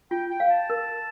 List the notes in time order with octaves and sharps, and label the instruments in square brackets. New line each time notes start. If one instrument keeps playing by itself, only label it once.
[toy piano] F4 [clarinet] G5
[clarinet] G5
[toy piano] F5
[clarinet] A5
[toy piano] A#4